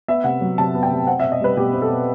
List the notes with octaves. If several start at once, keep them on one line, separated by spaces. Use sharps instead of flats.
B3 E5
C3 F#5
F#3
C3 A5
B3
G5
C3
C4 F#5
B2 E5
D#5
G3 B4
B2 G4
C4
A4
B2